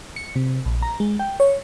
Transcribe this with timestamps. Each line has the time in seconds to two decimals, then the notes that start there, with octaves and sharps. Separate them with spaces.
0.16 C#7
0.35 C3
0.65 A#1
0.82 A#5
1.00 G#3
1.19 G5
1.40 C#5